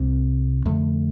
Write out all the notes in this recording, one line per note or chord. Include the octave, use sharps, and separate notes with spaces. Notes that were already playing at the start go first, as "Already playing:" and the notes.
Already playing: C2 C3
F2 D3 A3